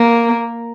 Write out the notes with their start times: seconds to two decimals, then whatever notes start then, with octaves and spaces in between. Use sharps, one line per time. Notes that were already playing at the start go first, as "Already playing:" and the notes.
Already playing: A#3